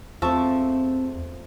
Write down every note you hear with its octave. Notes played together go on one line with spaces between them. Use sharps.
E2 F3 A3 C4 E5 A5 C#6